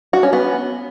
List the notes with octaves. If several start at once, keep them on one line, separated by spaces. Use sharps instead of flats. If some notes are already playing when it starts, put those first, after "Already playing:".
F#4
C#4
B3